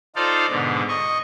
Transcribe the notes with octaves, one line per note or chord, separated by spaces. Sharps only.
D#4 F4 A4 C5 D5 F5
G#2 B2 D3
D#5 C#6